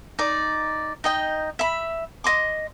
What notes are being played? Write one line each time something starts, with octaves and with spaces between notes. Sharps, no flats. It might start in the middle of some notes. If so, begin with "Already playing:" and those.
D#4 D5
D#4 D#5 G5
E5 B5
D#5 C6 D6